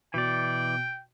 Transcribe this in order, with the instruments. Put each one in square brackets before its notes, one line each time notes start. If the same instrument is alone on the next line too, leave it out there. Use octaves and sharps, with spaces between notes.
[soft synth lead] B2 [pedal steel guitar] E3 D5 [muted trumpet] G5